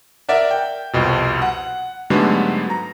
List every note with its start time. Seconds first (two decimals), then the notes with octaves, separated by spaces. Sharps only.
0.29 A#4 D5 E5 F#5
0.51 G5
0.93 C2 F2 B2
1.42 F#5
2.10 G#2 D3 F#3 G3 A3 B3
2.70 A#5